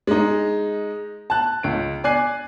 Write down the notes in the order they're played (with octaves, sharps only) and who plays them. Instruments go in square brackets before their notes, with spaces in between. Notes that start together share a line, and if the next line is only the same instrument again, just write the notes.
[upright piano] G#3 D#4
A5 F#6
C#2 D7
D5 G#5 F#6 C7